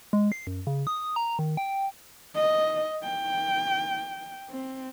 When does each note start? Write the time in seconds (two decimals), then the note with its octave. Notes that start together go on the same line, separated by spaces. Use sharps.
0.13 G#3
0.32 C7
0.47 F#2
0.67 C#3
0.87 D#6
1.16 A#5
1.39 D#3
1.57 G5
2.35 D#5
3.03 G5
4.51 C4